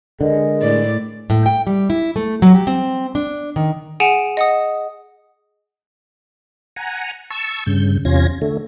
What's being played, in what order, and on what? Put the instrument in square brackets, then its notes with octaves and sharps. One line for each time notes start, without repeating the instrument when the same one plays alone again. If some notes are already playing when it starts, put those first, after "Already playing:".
[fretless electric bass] D3 [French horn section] G#3 G#4 A#4 [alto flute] D#5
[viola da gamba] A2 D5
[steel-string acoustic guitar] A2
G5
G3
E4
A3
F#3
G4
C4
D4
D#3
[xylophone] G#4 F#5 G#5 D7 E7
D#5 F#5 D#6
[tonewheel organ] F#5 G#5 A#5
A5 C#6 E6
G2 C#3 G6
E2 C3 C#4 F4 G#6 A#6
D3 A3